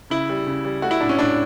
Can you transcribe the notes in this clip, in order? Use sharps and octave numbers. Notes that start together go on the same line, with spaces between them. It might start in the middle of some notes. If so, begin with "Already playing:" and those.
C#3 E4
G3
C#3
G3
A3 F#4
E4
A2 D4
C#4
A2 D4